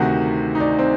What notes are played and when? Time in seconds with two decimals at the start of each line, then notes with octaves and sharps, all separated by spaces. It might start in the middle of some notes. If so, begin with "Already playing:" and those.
Already playing: D2 C3 D#3 F#4
0.55 D#4
0.60 D4
0.79 C4